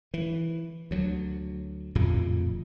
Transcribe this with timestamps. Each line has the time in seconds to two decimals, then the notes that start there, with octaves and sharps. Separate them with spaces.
0.14 E3
0.91 D2 F#3
1.95 D1 F2 A#2 C#3